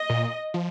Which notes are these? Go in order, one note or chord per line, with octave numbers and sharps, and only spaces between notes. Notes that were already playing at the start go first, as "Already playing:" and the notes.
Already playing: D#5
A#2
F3